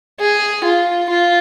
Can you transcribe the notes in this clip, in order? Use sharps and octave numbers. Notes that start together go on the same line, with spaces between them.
G#4
F4
F4